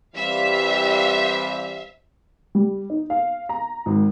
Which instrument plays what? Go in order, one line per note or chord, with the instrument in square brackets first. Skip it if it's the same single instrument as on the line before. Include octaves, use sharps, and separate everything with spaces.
[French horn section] E3 G3 C4 [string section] E5 F5
[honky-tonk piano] G3
D#4
F5
A#5
G#1